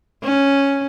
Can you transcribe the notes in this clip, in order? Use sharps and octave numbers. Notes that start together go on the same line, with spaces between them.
C#4